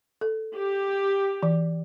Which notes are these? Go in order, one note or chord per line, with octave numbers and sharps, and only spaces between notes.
A4
G4
E3